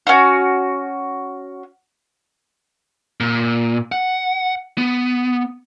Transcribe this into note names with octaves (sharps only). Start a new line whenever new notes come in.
C#4 F#4
A#2
F#5
B3